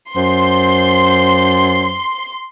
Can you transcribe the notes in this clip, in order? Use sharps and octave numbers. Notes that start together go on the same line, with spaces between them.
F#2 C5 C6